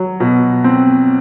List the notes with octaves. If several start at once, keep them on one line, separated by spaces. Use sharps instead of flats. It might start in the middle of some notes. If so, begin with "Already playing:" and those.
Already playing: F#3
B2
C4